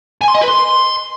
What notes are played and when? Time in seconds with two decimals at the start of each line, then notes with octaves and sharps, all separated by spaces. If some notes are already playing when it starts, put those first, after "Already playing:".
0.21 G#5
0.28 C6
0.35 D#5
0.41 B4
0.48 C6